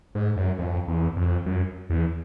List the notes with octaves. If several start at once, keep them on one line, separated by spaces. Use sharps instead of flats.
G#2
F#2
F2
E2
F2
F#2
E2